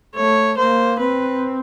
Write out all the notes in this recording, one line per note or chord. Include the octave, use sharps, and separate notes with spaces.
A3 C#5
A#3 C5
C4 B4